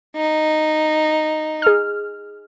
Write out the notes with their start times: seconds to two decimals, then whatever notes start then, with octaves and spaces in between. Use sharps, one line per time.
0.16 D#4
1.62 G#4 F6